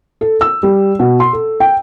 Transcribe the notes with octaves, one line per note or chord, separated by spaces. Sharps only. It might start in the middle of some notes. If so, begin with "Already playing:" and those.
A4
E6
G3
B2
C6
A4
G5